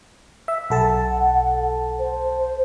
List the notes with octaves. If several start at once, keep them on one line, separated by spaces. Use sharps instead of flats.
E5
B1 A4 F#5 A5
C5